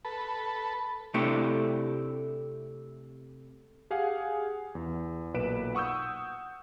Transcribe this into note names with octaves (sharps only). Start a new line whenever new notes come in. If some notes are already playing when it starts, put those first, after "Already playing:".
A4 B4
C3 A3 D4 E4 G4
G4 G#4 F5 F#5 G#5
E2
B1 A#2 B4 D7 E7
F#5 C#6 D#6 E6 G6